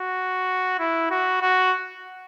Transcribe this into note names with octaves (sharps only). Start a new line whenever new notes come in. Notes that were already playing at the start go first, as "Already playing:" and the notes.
Already playing: F#4
E4
F#4
F#4